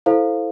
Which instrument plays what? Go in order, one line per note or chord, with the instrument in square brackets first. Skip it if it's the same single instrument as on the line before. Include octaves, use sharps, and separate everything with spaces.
[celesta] E4 A4 C5 F5